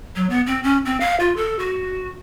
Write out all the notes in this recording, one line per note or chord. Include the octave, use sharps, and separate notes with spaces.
F#3
B3
C4
C#4
C4
F5
F4
A4
F#4